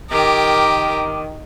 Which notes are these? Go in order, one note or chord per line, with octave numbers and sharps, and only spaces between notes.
D#3 G4 A#4 D6